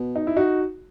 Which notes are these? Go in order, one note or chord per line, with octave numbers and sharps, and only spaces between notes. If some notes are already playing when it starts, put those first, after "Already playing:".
Already playing: B2
D#4
E4
D#4 F#4